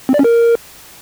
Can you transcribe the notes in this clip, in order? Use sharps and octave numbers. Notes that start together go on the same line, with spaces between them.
C4
D5
C#4
A#4